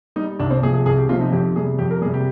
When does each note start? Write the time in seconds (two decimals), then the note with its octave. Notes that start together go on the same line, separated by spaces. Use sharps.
0.16 G3 D#4
0.39 C2 D4
0.51 C4
0.63 C3 F3 G#4
0.74 G#4
0.86 C2 G#4
0.98 G4
1.09 C3 F4
1.13 F3
1.21 D#4
1.32 F2 G4
1.56 C3 G3 G#4
1.79 F2 G4
1.91 A#4
2.01 G3 G#4
2.05 C3
2.14 G4